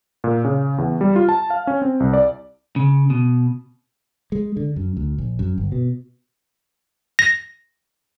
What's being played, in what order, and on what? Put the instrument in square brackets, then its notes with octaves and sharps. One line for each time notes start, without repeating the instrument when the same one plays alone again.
[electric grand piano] A#2
C#3
E2
G3
F4
A5
F5
C#4
C4
C2
D5
[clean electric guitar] C#3
B2
[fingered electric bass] G#3
D3
F#2
D2
A#1
F#2
G1
B2
[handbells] A#6